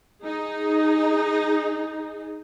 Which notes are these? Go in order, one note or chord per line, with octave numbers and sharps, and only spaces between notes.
D#4 G#4